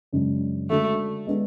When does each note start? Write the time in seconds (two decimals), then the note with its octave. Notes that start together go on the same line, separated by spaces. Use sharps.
0.12 F#2 C#3 G#3 D4
0.70 D3 G#3 A3 D4 F#4
1.27 G#3 B3 D4